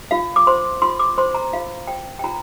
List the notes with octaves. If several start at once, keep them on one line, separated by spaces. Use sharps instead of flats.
F4 F5
D6
C5 C6
F4 C6
D6
C5 C6
A#5
F4 F5
C5 G5
G5
F4 A#5